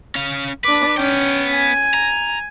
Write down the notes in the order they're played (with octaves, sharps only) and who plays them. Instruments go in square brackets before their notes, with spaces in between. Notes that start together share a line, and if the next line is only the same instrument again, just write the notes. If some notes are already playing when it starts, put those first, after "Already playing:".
[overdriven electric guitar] C#4 F5
[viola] D4 D6 [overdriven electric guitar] B4
[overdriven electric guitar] B3 G5 [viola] C#4
[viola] G#5
[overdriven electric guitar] A#5